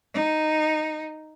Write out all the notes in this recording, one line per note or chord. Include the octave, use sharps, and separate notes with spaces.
D#4